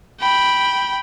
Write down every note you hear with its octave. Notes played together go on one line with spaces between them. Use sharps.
G5 B5